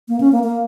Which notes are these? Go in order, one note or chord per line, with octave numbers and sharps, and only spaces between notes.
A#3
C#4
A#3
A#3